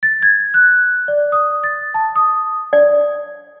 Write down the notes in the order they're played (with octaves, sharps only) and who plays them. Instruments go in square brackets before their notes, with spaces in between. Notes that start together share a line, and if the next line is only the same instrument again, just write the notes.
[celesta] A6
G#6
F#6
D5
D#6
A6
A5
D#6
[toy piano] D5